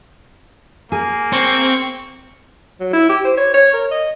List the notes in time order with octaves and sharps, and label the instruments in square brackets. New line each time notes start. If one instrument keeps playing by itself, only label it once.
[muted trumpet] A#3 [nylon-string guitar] G#4
[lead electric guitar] C4 [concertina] C#6
[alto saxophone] F#3
E4
G4
C5
C#5
C#5
A#4
D#5